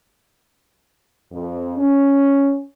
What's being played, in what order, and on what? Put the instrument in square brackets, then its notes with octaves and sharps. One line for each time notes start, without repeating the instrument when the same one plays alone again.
[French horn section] F2
C#4